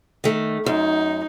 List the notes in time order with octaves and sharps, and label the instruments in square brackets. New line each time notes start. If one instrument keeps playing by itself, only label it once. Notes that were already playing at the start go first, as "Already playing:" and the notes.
[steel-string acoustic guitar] D#3 A3
[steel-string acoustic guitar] F#2 [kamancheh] D#4